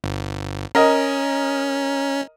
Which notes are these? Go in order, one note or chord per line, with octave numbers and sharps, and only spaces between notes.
G1
C#4 A#4 D#5